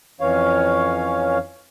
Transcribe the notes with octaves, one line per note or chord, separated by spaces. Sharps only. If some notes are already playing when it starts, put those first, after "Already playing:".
F2 E3 C#4 C#5 F5